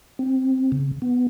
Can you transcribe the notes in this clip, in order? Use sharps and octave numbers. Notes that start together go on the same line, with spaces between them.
C4
C#3
B3